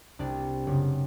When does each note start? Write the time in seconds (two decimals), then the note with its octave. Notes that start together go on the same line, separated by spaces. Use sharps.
0.19 C2 D4 D5
0.67 F#1